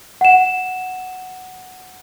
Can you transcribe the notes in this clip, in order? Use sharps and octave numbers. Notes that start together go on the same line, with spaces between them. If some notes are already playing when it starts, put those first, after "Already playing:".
F#5 E7